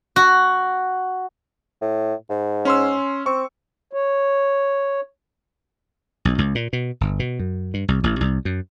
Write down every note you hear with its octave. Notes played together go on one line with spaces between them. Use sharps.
F#4
A2
G#2
C#4 C6 E6
C4 C#6
C#5
B1
C#2
A#2
B2
G1
B2
F#2
G2
C2
A1
C2
F#2